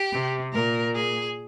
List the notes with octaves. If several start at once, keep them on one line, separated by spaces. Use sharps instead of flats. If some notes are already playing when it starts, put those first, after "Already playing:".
Already playing: G4
C3
A#2 A#4
G#4